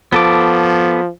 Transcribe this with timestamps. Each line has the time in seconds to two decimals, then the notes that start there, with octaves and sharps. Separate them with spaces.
0.13 F3 B3 A4 D6